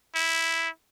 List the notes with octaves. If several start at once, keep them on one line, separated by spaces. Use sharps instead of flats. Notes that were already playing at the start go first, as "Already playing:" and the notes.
E4